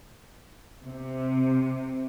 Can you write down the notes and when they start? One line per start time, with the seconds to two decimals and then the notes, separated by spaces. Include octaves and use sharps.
0.86 C3